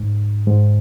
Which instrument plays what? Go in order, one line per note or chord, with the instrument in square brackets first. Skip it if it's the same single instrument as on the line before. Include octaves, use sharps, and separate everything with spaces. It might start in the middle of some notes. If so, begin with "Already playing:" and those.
Already playing: [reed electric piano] G#2
G#2